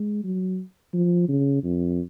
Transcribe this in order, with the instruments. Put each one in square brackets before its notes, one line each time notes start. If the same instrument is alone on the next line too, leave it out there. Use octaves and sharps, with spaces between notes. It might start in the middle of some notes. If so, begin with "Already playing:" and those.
Already playing: [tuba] G#3
F#3
F3
C#3
F2